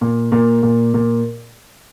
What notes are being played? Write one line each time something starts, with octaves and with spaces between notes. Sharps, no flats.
A#2
A#2
A#2
A#2